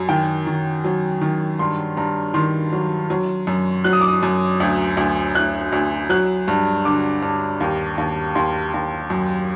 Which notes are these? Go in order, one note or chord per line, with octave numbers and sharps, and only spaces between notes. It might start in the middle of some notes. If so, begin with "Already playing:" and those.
Already playing: F#2 F#3
D#3 G5
D#3
F#3
D#3
G2 C6
G2 A#5
D#3 C6
F#3
F#3
F#2
F#3 F#6
D#6
D6
D#6
F#2
D2
D2
D2 F#6
D2
F#3 F#6
G2
D3 D6
G2
D#2
D#2
D#2 C6
D#2
F#2